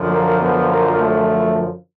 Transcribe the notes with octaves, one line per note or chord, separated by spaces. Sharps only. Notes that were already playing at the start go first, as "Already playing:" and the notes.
Already playing: F#2 D3 F3
A#3
B3
A#3
A3